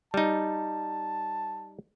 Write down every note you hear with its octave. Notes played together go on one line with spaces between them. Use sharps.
G3 D#4 A5